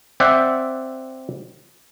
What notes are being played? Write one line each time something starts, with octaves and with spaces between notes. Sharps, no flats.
C4 C5 D5 E5 F#5